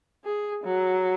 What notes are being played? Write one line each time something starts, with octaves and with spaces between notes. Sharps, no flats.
G#4
F#3